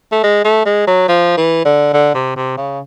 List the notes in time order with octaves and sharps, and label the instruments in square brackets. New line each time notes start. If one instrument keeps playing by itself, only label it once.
[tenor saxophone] A3
G#3
A3
G#3
F#3
F3
E3
D3
D3
C3
C3
C#3